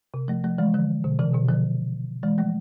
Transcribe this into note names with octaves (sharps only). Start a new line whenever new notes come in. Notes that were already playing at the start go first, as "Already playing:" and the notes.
C3
F3 A3
F3 A3
E3 G#3
D3 F3
B2 D3
C3 E3
B2 D3
D3 F3
E3 G#3
F3 A3